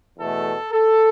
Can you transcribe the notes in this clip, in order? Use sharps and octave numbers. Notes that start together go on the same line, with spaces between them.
E2 B2 A3 A4
A4